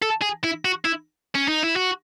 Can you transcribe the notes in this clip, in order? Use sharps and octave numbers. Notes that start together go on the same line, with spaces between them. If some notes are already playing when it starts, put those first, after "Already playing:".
A4
G#4
E4
F#4
E4
C#4
D#4
E4
F#4